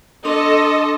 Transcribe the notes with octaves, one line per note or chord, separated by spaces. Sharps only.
D4 A4 D#5 C6